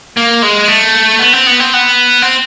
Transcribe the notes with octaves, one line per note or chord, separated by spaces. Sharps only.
A#3
G#3
A3
B3
C4
B3
C4
B3
C4